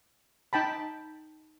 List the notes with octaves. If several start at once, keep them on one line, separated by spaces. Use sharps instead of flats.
D#4 G5 A5 B5